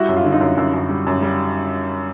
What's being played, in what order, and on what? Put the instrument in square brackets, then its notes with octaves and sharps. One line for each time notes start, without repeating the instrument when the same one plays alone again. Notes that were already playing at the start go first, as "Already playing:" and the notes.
Already playing: [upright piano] G3 E4 F#4
F#2
F4
D3 E4
D#4 F4
F#2
F#2
F#2
G3
F#2
G3